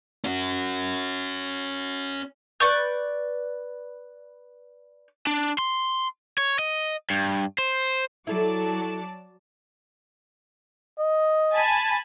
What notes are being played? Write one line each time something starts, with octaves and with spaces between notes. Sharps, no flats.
C#4 F#4
B4 D5 C#6 G6
D4
C6
C#5
D#5
G2
C5
F#3 E4 A4 D5 A5
D#5
G#5 A5 B5